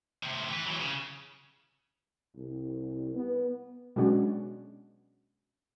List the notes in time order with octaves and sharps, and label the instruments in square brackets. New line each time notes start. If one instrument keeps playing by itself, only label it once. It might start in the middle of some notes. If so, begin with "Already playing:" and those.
[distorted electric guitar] A2 C3
E3 B4
E3 F#3
C#3
[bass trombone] C2
B3
[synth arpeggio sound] B2 F#3 G#3 C#4 D4 F#4